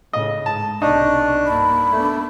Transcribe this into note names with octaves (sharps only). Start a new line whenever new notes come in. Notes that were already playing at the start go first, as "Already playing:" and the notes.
A2 C#3 D#5
G#2 A5
B1 C3 D4 D#4 C#6
G2 A#3 B5
A3 B3 D4